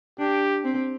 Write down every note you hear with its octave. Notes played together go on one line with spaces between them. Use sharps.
D4 G4
C4